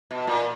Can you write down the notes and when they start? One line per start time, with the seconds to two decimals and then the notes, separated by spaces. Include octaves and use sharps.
0.11 B2
0.27 A#2